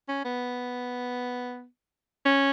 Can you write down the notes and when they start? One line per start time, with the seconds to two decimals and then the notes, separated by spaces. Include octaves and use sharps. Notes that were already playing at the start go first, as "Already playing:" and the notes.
0.08 C#4
0.25 B3
2.25 C#4